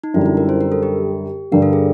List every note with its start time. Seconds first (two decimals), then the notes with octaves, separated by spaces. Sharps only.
0.04 D#4
0.14 F#2 D3 G3 E4
0.21 D#4
0.26 E4
0.37 A#4
0.49 C5
0.61 A#4
0.72 A4
0.83 G4
1.52 G2 D3 G3 A#4
1.62 A4
1.73 G#4